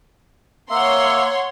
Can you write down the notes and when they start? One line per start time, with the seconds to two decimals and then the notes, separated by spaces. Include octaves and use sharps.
0.70 A#3 C#5 E5 F#5 C6